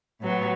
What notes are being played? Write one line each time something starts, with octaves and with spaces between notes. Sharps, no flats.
A2 F#3 B3